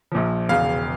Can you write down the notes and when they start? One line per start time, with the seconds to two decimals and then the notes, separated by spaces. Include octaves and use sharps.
0.12 A#1 A#2 F3
0.49 E1 E2 C#3 F5